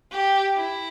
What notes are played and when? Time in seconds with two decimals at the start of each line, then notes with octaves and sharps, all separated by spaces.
0.11 G4
0.57 E4